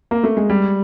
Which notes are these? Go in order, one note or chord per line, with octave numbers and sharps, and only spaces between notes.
A#3
A3
G#3
G3